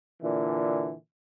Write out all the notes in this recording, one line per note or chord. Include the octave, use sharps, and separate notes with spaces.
A#2 D3 E3